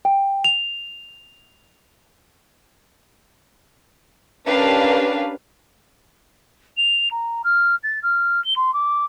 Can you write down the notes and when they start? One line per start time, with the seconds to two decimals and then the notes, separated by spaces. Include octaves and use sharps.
0.05 G5
0.44 F7
4.47 C#4 D4 G4 A#4 B4 F5
6.77 F7
7.11 A#5
7.44 F6
7.83 A6
8.03 F6
8.44 G7
8.56 C6
8.73 D6